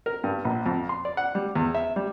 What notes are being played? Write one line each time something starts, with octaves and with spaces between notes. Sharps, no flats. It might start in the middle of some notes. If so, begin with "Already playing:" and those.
A#4
G2
A#1
F2
C6
D5
F#5
G3
E2
E5
G3